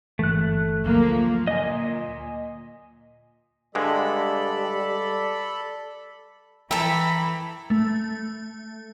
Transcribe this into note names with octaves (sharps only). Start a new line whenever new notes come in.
G1 E3 A3 F#6
D2 F3 F#3 A#3
A#2 D#5 G#5
G2 D3 G3 G#3 A4 D5 B5
E3 A4 E5 G5 A#5 B5
A3